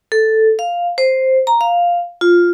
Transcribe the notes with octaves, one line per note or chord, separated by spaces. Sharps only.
A4
F5
C5
A#5
F5
F4